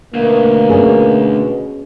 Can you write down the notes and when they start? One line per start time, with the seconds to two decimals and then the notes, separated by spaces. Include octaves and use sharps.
0.14 D2 B2 A#3
0.69 C#4 F#4 G#4